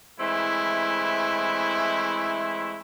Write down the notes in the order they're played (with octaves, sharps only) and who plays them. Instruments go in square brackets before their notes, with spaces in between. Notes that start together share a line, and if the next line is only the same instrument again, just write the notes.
[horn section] E3 G#3 A3 C4 E4